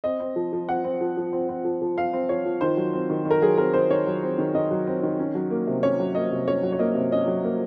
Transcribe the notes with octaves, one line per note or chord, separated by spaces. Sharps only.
C4 D#5
C4
F3
F3
C4 F#5
C4
F3
F3
C4
C4
F3
F3
C4 F5
C4
F3 C#5
F3
D#3 C5
F#3
C4
D#3
D#3
A#4
F#3 G#4
C4 A#4
D#3 C5
D#3 C#5
F#3
C4
D#3
D#3 D#5
F#3
C4
D#3
C#4
F#3
A#3
C3
C#4 C#5
F#3
A#3 D#5
C3
C#4 C#5
F#3
C#5
A#3 D#5
C3
C#4 D#5
F#3
A#3